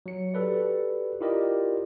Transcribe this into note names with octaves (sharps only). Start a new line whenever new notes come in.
F#3 C#7
F#4 G4 A4 B4 D5
E4 F4 G4 A#4 D5 D#5